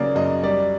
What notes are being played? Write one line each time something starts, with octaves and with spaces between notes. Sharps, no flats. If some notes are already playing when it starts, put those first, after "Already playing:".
Already playing: C#3 F#3 A#3 D5
F#2 D#5
G3 D5